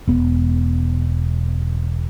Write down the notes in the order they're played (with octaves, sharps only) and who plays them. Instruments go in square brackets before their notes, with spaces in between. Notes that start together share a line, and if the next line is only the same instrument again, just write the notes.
[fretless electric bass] E1 B3